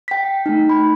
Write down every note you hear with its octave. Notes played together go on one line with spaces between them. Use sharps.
G5 B6
A3 D#4
B5